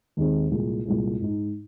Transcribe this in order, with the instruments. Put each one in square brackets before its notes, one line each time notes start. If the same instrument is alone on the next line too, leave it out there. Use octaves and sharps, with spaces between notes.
[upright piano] D#2 D#3 G#3 C4
C2 A#2 G#3
C2 A#2 G#3
G#2 G#3 D#4